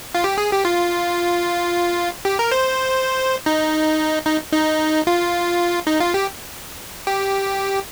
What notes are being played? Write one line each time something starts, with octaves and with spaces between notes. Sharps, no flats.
F4
G4
G#4
G4
F4
G4
A#4
C5
D#4
D#4
D#4
F4
D#4
F4
G4
G4